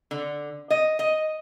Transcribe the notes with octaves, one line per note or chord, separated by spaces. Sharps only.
D3
D#5
D#5